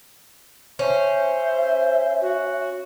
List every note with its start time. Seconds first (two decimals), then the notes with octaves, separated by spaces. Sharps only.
0.79 C#4 C5 E5
2.21 F#4